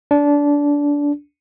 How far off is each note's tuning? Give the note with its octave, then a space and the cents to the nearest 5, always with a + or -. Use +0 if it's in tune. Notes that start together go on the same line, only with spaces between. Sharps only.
D4 -20